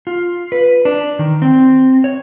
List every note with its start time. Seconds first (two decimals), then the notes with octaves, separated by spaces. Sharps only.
0.07 F4
0.52 B4
0.85 D4
1.19 D#3
1.42 C4
2.04 C#5